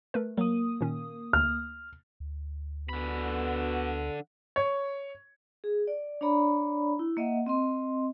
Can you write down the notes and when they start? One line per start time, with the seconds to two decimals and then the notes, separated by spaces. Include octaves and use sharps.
0.14 A3 A#4 B4
0.37 F#3 A#3 D#6
0.81 A#2 D#3 C#4
1.33 D2 F6
2.20 D2
2.89 D3 B3 F#4 B5
4.56 C#5
5.64 G#4
5.87 D5
6.21 D4 C#5 D5 A#5 B5
6.99 E4
7.17 A#3 D#5 E5 F#5
7.46 C4 D#5 C6